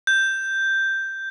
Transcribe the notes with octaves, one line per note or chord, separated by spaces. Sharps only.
G6